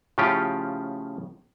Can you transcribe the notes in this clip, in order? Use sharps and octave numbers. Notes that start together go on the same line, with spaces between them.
A2 C#3 F3 C#4 F4 G4